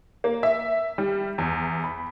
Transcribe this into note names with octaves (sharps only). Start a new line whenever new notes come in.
A#3
E5
G3
E2
B5